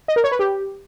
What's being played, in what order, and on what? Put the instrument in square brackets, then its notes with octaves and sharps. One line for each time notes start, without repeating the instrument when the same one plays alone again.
[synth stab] D#5
A#4
C#5
B4
G4